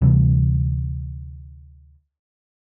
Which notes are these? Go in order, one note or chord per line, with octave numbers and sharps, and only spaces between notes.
D2 C3 E3 G3